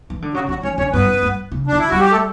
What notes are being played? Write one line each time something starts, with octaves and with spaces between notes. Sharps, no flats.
E3
D3
C#3 F#3 F#4
D3 F#3 F#4
E3 C#4 C#5
D3 C#4 C#5
G2 B3 B4
F#2
G2
C#3
D4
D3
E4
G3 F#4
G4
A3 A4